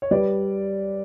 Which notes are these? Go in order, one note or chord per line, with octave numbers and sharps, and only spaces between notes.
C#5
G3 B4 D5